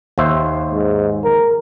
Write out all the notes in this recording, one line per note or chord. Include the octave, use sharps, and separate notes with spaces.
D#2 C5 E5
G#2
A#4